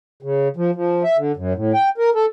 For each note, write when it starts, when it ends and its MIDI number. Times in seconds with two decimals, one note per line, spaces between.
0.23 0.48 49
0.57 0.71 53
0.75 1.03 53
1.04 1.17 76
1.17 1.32 50
1.36 1.53 42
1.55 1.72 45
1.74 1.89 79
1.98 2.10 70
2.15 2.26 69